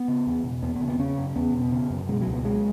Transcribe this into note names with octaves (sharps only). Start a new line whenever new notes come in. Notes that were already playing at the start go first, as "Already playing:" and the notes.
Already playing: B3
C#3
E2
B2
E2 B3
B3
C#3
B3
C#3 C#4
F#2
E2 B3
B2
C#3
F#2
B2 G#3
F#3
C#2
B3
C#3 G#3